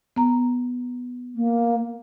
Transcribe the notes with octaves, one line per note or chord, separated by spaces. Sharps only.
B3 A#5
A#3